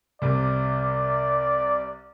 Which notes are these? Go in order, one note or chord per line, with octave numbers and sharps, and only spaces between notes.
C2 C3 D5